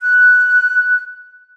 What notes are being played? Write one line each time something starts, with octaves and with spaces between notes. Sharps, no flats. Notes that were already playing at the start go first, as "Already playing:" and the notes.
F#6